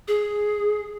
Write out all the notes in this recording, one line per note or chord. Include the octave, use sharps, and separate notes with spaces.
G#4